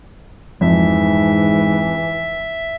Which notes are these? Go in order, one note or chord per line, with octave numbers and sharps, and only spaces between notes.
F2 G#2 E3 E5